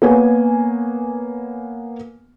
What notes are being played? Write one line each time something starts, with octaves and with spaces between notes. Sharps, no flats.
A#3 B3 C#5 G#5